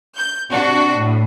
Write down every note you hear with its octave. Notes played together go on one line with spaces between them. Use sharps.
G6
C3 D4 F#4
A2